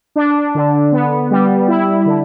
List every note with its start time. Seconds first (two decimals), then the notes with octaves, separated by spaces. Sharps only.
0.16 D4
0.55 D3
0.92 B3
1.31 G3
1.68 E4
2.06 D3